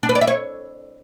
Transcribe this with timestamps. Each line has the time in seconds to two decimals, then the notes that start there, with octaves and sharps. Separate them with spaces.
0.03 D4
0.09 B4
0.15 D5
0.21 E5
0.27 C#5